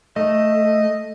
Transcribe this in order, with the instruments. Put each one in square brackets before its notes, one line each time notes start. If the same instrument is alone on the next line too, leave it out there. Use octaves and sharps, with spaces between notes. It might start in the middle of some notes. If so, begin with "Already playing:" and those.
[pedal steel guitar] A3 [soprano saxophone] D#5